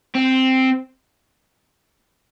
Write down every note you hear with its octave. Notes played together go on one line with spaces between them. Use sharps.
C4